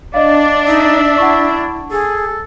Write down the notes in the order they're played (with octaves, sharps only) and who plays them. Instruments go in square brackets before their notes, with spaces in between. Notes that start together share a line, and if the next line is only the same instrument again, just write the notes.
[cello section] D4 [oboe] D5 [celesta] D#5 F5
[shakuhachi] D#4 [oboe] E5
[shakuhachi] E4 [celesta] F#5 A5 C#6
[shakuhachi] G#4 [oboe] A4